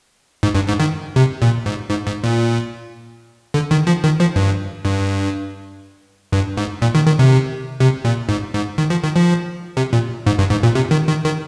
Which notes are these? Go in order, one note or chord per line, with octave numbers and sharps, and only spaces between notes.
G#2
G2
G#2
D#3
C3
A#2
G#2
G#2
G#2
A#2
D3
D#3
F3
D#3
F3
G2
G2
G2
G#2
A#2
D#3
D#3
C3
C3
A#2
G#2
G#2
D#3
F3
D#3
F3
C3
A#2
G#2
G2
G#2
A#2
C3
D#3
D#3
D#3